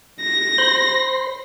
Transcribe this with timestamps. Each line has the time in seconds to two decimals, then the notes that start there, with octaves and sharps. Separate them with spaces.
0.21 A#6
0.58 C5 B5 C6